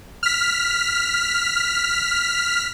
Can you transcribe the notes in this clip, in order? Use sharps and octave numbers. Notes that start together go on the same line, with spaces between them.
F6 B6